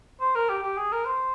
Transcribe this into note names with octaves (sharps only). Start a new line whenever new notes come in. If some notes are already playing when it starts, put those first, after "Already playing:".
C5
A#4
G4
G4
G#4
A#4
C5